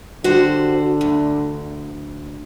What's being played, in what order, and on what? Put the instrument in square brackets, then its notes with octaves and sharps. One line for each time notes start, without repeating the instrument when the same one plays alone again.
[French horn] D3 [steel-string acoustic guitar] F#4 G4 C5
[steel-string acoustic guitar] D2